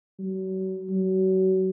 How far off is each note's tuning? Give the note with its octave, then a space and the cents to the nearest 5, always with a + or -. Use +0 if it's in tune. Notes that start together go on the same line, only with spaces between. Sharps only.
F#3 +40
F#3 +35